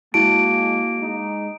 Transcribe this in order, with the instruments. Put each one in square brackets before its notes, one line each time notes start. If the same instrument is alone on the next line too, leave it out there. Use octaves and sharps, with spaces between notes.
[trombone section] G#3 [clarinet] A#3 [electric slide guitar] E4 F#4 A5 [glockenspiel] D7
[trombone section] G#3 D#4